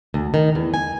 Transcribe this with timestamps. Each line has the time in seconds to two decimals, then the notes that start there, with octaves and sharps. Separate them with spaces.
0.14 D2
0.34 D#3
0.55 E2
0.74 G#5